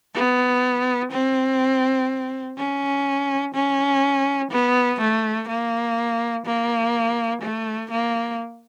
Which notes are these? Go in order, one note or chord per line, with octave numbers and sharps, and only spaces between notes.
B3
C4
C#4
C#4
B3
A3
A#3
A#3
A3
A#3